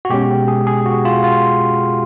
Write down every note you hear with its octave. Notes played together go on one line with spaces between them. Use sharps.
F#4
B2 G#3 C#4 G4
G#4
G#4
F#4
F4
F4